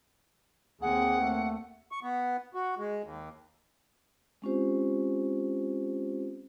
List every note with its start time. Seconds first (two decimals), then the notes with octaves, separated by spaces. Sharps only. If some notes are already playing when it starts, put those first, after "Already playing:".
0.81 D#2 A#3 C4 G#4 F#5
1.21 A3
1.92 C#6
2.03 B3
2.54 F#4
2.78 G#3
3.03 D#2
4.42 G#3 C4 C#4 F4 G4 C5